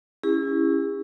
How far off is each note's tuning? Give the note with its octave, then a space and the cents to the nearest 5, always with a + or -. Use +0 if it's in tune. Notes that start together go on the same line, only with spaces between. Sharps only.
C#4 +0 E4 +0 G#4 -45